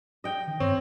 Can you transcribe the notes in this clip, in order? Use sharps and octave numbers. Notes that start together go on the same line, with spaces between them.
D#5 G5
D#3
G2 C4 C#5